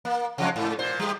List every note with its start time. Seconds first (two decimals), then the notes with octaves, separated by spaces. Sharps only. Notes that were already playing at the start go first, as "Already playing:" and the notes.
0.05 A#3
0.38 C3 F3 G#3
0.56 G#2
0.79 A#2 C5
0.99 G3 G4